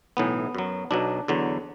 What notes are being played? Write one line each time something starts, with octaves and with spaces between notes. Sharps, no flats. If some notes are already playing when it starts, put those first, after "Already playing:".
B1 A2 E3 B3
F#2 F#3
B1 B2 F#3 D4
E2 D3 F#3